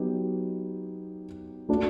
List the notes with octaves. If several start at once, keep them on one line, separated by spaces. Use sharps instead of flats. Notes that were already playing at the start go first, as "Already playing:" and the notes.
Already playing: F#3 B3 D#4 G4
A3 D4 F#4